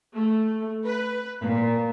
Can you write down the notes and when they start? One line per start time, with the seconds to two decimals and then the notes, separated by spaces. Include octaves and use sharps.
0.13 A3
0.84 B4
1.42 A#2